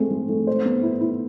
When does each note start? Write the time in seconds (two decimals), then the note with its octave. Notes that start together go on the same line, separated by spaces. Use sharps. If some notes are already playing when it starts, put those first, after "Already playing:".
Already playing: G#3 A3 C4
0.11 A3
0.29 A3
0.47 C5
0.65 B3
0.83 E4
1.01 E4